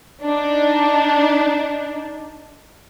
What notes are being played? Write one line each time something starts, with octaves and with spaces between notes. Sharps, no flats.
D4 D#4